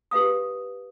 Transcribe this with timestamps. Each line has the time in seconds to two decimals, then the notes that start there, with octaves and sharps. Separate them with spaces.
0.11 G4 B4 F5 D#6